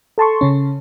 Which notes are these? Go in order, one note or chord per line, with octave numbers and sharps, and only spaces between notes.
A4 A5 C6 C#6
C#3 C#4